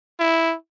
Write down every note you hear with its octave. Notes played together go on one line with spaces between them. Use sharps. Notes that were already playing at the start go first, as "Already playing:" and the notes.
E4